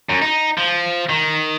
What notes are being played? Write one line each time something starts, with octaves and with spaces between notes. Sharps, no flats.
F#2
D#4
F3
D#3